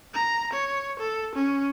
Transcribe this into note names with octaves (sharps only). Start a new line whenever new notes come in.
A#5
C#5
A4
C#4